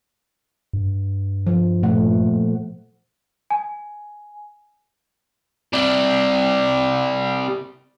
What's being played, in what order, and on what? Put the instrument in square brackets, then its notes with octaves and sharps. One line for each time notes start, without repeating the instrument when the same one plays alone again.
[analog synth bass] G2
[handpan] F3
A#2 A3 F#5
[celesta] G#5
[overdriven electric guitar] C3 G3